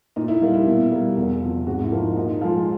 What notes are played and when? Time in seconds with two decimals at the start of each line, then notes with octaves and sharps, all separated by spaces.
0.16 A#2 D#4
0.28 E4
0.41 G3 A#3 D#4
0.54 E4
0.67 B2
0.91 G3 A#3
1.17 E2
1.41 C3 F3
1.67 G#2 F#4
1.83 E4
1.91 F3 A#3
2.00 D#4
2.17 A#2 D#4
2.42 F3 G#3